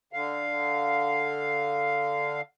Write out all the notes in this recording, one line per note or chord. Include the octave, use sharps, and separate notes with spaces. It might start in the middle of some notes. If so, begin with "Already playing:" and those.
D3 F5